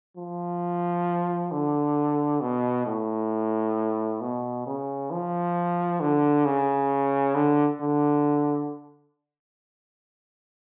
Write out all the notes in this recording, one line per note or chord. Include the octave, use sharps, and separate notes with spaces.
F3
D3
B2
A2
B2
C#3
F3
D3
C#3
D3
D3